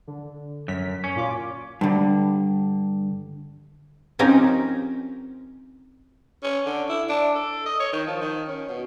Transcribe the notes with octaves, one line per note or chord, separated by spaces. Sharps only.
D3
F#2 B6
C#4
A#2 F4 D6
G2 D3
F3 C4 C#4 D#4 G4 A#4
C#4
D3
E4
D4
A4
D#5
C#5
D#3
F3
D#3
C#4
B2